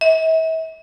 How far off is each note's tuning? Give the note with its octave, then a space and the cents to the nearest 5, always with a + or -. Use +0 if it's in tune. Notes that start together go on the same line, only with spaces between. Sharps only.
E5 -40